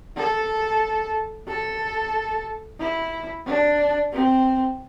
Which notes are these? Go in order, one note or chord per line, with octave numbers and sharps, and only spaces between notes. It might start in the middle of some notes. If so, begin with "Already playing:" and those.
A4
A4
E4
D4
C4